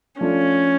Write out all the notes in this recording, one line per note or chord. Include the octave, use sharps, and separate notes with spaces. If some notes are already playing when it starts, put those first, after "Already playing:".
F3 A3 C#4 D4 F4